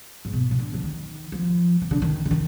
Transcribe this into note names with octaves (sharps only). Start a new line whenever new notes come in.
G#2
B2
C3
D3
F3
D#3
F3
D#3
D3
D#3
D3
D#3